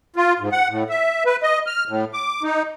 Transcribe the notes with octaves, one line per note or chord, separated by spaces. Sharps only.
F4
G#2
F#5
A2
E5
B4
D#5
F6
A2
D6
D#4